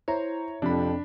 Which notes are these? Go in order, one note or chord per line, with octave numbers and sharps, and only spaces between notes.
E4 C5 C#5 A#5
F2 C3 F3 D4 B5